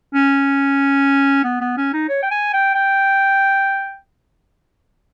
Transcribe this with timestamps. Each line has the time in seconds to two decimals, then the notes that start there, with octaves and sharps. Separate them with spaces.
0.14 C#4
1.44 B3
1.61 B3
1.77 C#4
1.93 D#4
2.09 C#5
2.22 G5
2.31 G#5
2.53 G5
2.75 G5